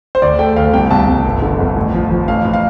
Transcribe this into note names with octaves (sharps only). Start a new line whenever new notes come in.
C5
D2 D5
A3 G5
D2 F5
C2 G5
C2 A5
C2
G1
D3
F2
A1
F3
F3
A1 F5
A1
F5